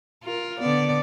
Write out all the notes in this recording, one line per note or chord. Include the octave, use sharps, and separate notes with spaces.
F4 A#4
D3 B3 D5